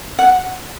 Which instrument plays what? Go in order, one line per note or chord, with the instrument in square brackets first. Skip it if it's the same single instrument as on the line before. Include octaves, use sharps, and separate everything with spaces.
[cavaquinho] F#5